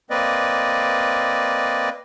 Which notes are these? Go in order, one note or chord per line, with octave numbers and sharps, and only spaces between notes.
A#3 C4 B4 D5 D#5